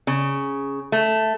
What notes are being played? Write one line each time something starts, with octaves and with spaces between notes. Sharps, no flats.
C#3
A3